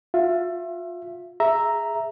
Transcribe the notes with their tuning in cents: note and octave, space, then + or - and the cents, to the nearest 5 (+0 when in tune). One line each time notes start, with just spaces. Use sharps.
F4 +35 E5 +25
G#4 +0 E5 +0 A#5 +0